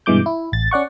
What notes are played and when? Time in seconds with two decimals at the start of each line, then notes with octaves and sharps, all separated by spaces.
0.06 G2 B2 E3 G#3 D6 G6
0.26 E4
0.52 A1 A6
0.71 C#4 D5 F#5 C#6